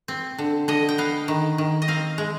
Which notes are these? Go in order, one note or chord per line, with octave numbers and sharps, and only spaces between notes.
C4
D3
D3 D#5
G5
B3 F5
D#3
D#3
D#5
C4 F5
G#3